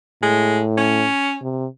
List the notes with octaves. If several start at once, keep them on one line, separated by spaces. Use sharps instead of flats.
A2 G#3
C#4
C3